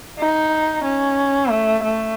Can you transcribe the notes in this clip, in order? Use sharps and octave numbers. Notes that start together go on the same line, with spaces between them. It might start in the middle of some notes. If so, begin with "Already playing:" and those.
D#4
C#4
A3
A3